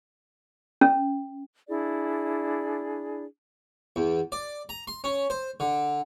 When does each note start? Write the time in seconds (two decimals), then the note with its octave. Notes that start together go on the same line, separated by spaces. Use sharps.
0.81 C#4
1.69 D4 E4 G#4 D5
3.96 E2
4.32 D5
4.69 A#5
4.88 C6
5.04 C#4
5.30 C5
5.60 D3